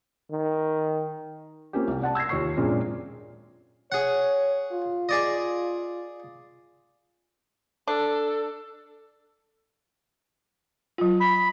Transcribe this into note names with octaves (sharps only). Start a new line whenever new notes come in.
D#3
A#3 C4 C#4 F4 G4
C2
D5 F#5 A5
E6 G#6 A#6 C7
D#2 F4 C#5 C#6 C7
F#2 A#2 G#3 C4 D4 F4
G#4 C#5 F#5
F4
G#4 D5 D#5
D4 A4
F#3 F4
B5